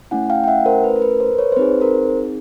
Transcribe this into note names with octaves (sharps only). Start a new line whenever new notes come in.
A3 C#4 E4 F#5 G#5
F5 G5
G5
E5 F#5
A#4 C5
B4
A#4
B4
A#4 C5
B4 C#5
C5
C4 D#4 G#4 B4
A#4 C5